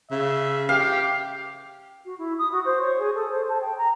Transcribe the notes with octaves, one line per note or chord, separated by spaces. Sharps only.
C#3 E5
G4 F5
F#4
E4
D#6
F#4
C5
C#5
G#4
A4
C5
A5
G5
A#5